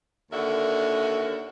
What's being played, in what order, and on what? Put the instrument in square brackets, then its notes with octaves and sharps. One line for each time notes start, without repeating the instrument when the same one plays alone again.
[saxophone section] D#2 D3 F#4 A#4 E5